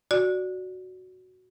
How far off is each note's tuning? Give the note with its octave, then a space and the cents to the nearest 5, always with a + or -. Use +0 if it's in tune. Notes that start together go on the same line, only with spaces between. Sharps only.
F#4 +0 D5 +0